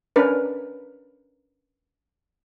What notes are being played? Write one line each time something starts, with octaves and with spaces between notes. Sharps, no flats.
C#4 D4 A#4 B4